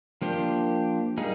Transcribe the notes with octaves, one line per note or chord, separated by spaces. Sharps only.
F3 A#3 D4 G4 C5
G3 A#3 D#4 G#4